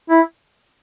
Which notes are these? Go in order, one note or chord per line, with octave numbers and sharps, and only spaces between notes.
E4